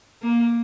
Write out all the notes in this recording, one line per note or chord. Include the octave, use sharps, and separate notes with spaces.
A#3